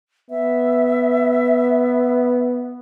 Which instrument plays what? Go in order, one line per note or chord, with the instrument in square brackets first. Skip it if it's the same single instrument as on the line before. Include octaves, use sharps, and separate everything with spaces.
[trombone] B3 [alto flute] E5